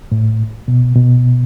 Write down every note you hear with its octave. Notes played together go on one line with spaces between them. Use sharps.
A2
B2
B2